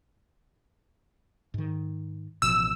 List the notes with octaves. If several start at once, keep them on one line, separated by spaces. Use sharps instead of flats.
G#2 D#3
A1 B2 F3 E6